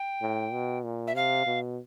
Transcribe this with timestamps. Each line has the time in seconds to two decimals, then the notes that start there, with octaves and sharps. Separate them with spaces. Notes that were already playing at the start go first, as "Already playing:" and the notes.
Already playing: G5
0.22 A2
0.53 B2
0.85 A#2
1.07 E5
1.15 C3 F5
1.47 B2